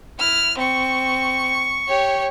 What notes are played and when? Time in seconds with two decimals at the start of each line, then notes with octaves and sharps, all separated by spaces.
0.19 E4 F6
0.58 C4 C#6
1.88 G4 C#5